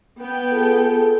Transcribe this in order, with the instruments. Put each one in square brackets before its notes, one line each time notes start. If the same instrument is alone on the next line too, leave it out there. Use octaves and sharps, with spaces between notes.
[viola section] B3 G5
[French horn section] F4 G#4 A4